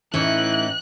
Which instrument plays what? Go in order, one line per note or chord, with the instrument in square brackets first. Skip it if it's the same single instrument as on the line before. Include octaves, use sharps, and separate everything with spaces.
[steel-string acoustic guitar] A2 C#4 D#4 [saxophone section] E3 [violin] F#6